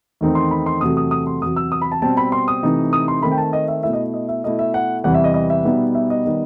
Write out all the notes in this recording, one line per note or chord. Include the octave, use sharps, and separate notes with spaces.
E2 D#3 A3 C4 D#4
C6
B5
C6
E2 C3 F#3 A3 D#6
D#6
D#6
C6
E2 C3 F#3 D#6
E6
D#6
B5
A5
B2 G3 C4 A5
B5
C6
D#6
C3 E3 A3 D#4
D#6
C6
D#3 A3 C4 B5
G5
A5
D#5
E5
B2 A3 E4 E5
D#5
D#5
E5
B2 A3 E4 D#5
E5
F#5
E2 C3 E3 G3 F#5
E5
D#5
D#5
E5
B2 G3 B3 D#4
E5
D#5
D#3 G3 B3 D#4